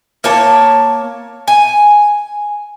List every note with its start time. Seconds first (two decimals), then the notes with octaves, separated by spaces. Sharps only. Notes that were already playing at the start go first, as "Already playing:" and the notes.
0.24 A#3 C#5 A5
1.48 G#5